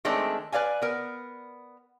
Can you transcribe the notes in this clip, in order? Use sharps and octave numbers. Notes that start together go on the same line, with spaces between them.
D#3 G#3 A3 C4 D4
B4 D5 F5 G#5
B3 A#4